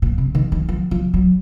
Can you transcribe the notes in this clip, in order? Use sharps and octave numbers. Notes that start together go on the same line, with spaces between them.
A#2
C3
D#3
D#3
F3
F3
F#3